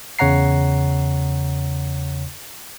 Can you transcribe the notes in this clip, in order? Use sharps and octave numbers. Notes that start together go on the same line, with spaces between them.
E2 C#3 C#5 F#5 A#5 C7